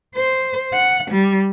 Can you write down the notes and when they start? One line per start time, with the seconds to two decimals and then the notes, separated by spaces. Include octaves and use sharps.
0.16 C5
0.73 F#5
1.11 G3